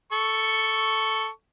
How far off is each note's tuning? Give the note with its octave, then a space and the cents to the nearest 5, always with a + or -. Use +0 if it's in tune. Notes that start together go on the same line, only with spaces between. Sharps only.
A4 +0 C#6 +0